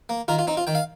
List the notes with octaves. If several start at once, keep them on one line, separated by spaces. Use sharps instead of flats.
A#3
D#3 F4 A#4
F4
C4 D#4
F4
D#3 G5
F5